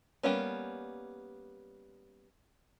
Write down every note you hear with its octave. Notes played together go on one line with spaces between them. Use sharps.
G3 A#3 B3 C#4